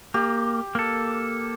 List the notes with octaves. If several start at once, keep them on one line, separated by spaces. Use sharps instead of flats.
A#3 G4
A#3 A4